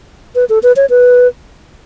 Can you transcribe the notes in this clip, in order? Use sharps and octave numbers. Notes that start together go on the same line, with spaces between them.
B4
A4
B4
C#5
B4